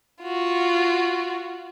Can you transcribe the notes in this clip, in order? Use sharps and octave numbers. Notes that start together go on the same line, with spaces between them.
F4 F#4